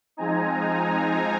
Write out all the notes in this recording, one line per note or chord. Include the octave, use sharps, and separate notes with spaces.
F3 G#3 C4 D#4 G#5 A#5